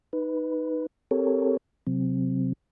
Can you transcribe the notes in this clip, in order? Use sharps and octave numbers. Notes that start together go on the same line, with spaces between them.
D#4 B4
C4 G4 A4 A#4 C#5
C3 F#3 C4